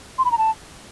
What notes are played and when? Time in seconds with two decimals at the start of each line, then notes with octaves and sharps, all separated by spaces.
0.18 C6
0.25 B5
0.31 A#5
0.38 A5